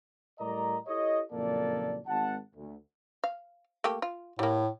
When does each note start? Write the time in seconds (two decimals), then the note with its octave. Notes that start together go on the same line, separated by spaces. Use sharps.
0.39 A2 G3 A#4 D5 D#5 A#5
0.87 E4 G4 A4 C#5 D#5
1.32 F#1 F2 A#2 A#3 A4 D5
2.07 G#1 F#5 A5
2.55 D2
3.24 F5
3.84 A3 A#3 G4
4.02 F4
4.39 A2 G3 A#3